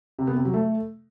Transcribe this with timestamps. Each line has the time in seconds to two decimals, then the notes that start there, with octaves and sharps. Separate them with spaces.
0.19 C3
0.27 B3
0.36 C3
0.45 F#3
0.54 A3